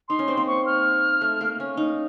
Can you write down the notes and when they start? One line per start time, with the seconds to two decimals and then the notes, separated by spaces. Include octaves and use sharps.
0.09 D#4 C6
0.19 C#4
0.28 C4
0.37 A#3
0.47 C#6
0.66 F6
1.21 A3
1.41 A#3
1.60 C#4
1.77 D#4